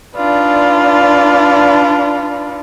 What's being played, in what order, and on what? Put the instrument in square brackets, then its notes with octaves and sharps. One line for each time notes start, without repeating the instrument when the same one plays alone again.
[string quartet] D4 D#4 F4 B4 D5